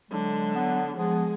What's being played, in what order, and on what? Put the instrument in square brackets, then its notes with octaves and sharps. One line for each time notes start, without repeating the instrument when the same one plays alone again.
[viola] D3 [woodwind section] F#3 G#3
[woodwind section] F#3 B3
[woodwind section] F3 B3 [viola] G#3